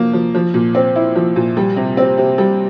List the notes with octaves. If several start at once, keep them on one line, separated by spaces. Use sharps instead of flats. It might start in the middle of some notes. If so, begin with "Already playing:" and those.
Already playing: F3 A#3
F3
F3
A#2
C4
E4
F3
A#2
G3
C3
C4
C3
G3